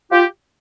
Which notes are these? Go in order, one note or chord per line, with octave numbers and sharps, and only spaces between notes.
F4 G4